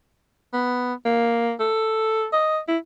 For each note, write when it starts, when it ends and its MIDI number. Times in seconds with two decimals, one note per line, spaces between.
0.53 0.93 59
1.05 1.52 58
1.60 2.26 69
2.33 2.59 75
2.68 2.78 64